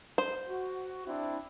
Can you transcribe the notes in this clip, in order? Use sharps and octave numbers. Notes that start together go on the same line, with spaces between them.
C5
F#4
C4 D4 E4